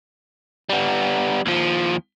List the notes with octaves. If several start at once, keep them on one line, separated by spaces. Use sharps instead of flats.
G3 B3
D#2 F3